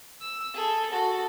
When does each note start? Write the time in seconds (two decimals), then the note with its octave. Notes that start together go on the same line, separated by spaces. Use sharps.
0.21 E6
0.54 G#4 A4
0.90 F#4 A4